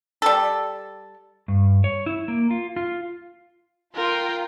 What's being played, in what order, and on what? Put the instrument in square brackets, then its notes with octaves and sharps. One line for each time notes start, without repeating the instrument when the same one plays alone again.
[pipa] G3 A4
[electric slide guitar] G2
C#5
E4
A#3
F4
F4
[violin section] F4 [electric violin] A#4 G5